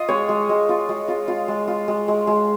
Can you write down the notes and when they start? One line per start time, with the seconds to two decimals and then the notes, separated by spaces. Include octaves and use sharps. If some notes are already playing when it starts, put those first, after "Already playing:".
Already playing: F4 D#5
0.08 G#3 C#5
0.29 G#3
0.49 G#3
0.69 F4
0.89 G#3
1.08 F4
1.28 F4
1.48 G#3
1.68 F4
1.88 G#3
2.08 G#3
2.27 G#3